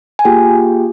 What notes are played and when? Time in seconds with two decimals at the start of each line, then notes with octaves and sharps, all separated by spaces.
0.19 G#5
0.25 A#3 F4 G4 G#4 G5